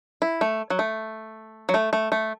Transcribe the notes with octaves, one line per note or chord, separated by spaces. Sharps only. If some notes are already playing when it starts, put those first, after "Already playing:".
E4
A3
F#3
A3
F#3
A3
A3
A3